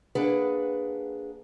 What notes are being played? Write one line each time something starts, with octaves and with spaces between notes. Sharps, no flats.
A#3 D4 G#4 B4 F#5